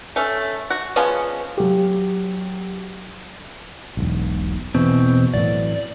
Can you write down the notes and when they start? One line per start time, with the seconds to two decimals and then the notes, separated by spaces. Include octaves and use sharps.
0.16 A3 C#4
0.70 F#4
0.96 F3 G#3 B3 C#4
1.57 F#3 G4
3.97 E1 B1
4.75 E2 B2 E3 C4
5.34 A2 E3 F#3 D5